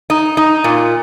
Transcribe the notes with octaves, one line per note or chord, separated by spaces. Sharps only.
D#4
D#4
A#2